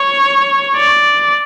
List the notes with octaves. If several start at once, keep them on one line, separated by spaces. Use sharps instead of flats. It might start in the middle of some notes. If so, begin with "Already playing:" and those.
Already playing: C#5
D5